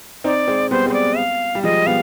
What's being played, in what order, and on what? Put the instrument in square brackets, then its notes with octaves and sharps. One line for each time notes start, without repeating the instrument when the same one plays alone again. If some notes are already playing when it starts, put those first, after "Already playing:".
[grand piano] C4 D#4 [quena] D5
[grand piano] G#3 C4
[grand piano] G3 B3 [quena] C5
[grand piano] G#3 C4
[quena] C5
D5
F5
[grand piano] G3
[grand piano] F3 G#3 [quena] D#5
[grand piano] G3 B3 [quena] F5